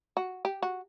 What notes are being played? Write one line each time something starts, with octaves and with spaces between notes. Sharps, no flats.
F#4
G4
F#4